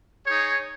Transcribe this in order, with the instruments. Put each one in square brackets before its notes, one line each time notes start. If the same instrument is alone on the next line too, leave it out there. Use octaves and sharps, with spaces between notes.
[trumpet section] D#4 G#4 C#5